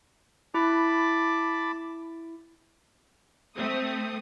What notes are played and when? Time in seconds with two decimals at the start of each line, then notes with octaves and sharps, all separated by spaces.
0.54 E4 A5 B5 D6
3.55 A3 C4 D#6